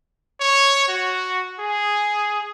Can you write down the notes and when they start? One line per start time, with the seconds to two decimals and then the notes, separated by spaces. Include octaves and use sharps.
0.41 C#5
0.88 F#4
1.59 G#4